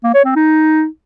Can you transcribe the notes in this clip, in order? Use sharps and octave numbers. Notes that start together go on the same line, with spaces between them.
A#3
C#5
C4
D#4